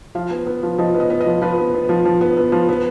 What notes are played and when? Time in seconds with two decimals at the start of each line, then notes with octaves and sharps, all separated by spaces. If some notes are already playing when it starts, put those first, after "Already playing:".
0.15 F3 F5
0.31 B3
0.46 B3
0.63 F3
0.78 F3 D#5
0.94 B3
1.00 D#5
1.10 B3
1.21 D#5
1.26 F3
1.41 F3 B4
1.58 B3
1.74 B3
1.89 F3
2.05 F3
2.21 B3
2.37 B3
2.52 F3
2.69 B3